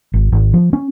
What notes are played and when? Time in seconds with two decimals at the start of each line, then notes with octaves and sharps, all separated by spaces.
0.14 G#1
0.32 G#1
0.53 F3
0.73 C#4